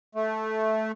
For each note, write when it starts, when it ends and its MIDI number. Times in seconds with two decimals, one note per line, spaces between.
0.15 0.92 57